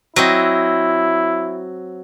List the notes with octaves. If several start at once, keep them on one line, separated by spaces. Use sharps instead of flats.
F#3 C4 E4 D#5